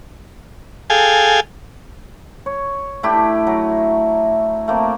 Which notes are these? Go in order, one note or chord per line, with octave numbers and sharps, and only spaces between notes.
G#4 A4 F5 G5 G#5
C#5
A3 D4 E4 G4
F#3
A3 A#3 C4